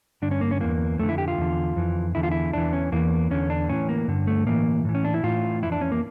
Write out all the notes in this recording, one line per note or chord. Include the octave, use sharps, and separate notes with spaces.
G2 D3 D4
C#4
A#3
C#4
E2 E3 A#3
F2 D3 A3
E4
G4
F4
E2 D3
F2 E3
E2 D3 E4
F4
E4
E2 E3 D4
C#4
E2 E3 A#3
E2 D3 C#4
D4
A2 E3 C#4
A#3
G2 D3
A3
A2 E3 A#3
A2 E3
C#4
D4
E4
A2 E3 F4
F2 E3 E4
D4
C#4
A#3